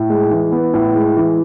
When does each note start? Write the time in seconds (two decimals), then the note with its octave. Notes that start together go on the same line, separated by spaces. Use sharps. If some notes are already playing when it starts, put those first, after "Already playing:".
Already playing: A2
0.10 G#3
0.31 E3
0.52 B3
0.74 A2
0.95 G#3
1.17 E3